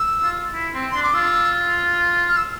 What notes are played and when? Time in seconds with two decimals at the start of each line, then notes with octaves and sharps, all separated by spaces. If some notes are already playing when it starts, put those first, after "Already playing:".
Already playing: E6
0.23 F4
0.54 E4
0.74 C4
0.92 D4 C6
1.03 D6
1.14 F4 E6
2.28 F6
2.37 E6